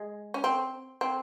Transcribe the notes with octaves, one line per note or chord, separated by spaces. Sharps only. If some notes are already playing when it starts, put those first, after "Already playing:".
Already playing: G#3
C#4
C4
C4